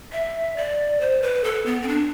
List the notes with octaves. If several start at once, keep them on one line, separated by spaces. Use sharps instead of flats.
E5
D5
C5
B4
A4
B3
C4
D4